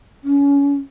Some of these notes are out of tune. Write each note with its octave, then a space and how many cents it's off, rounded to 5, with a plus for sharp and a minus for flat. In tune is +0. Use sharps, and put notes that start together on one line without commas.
C#4 +25